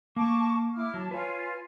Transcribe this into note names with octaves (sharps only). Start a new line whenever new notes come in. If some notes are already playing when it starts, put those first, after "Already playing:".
A#3 A5 C#6 D6
E4 D6 F6
F#3 A5
F4 B4 C#5 G#5